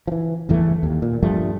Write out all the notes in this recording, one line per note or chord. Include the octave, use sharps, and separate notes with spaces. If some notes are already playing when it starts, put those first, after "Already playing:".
E3 F3
G1 E2 E3 A3
D#2
A#2
G2 F3 G3 A3